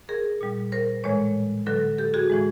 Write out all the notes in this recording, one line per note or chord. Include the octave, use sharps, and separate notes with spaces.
G#4 A#4
A#2 G3
A#4 C5
A2 E3 G#3 B4 C#5
D3 F#3 A4 B4
G4 A4
F#4 G#4
A2 E3 G#3